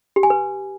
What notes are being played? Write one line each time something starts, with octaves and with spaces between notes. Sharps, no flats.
G4
G#5
B4